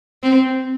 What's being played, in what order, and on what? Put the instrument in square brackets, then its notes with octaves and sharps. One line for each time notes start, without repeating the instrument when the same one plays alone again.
[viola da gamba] C4